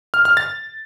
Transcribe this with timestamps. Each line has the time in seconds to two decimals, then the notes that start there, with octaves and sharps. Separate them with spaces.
0.14 F6
0.25 F6
0.37 A6